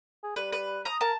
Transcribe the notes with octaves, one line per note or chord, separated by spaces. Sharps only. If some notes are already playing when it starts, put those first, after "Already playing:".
G#4
G3 B4
B4
A#5 D#6
A#4 A5